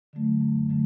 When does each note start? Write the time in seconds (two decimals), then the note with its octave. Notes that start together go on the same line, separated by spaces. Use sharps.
0.13 D3 F#3 A3
0.41 F#2
0.69 D3 F#3 A3